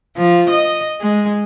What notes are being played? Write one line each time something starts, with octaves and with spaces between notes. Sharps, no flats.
F3
D#5
G#3